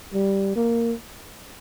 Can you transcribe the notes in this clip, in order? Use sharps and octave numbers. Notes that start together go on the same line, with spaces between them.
G3
A#3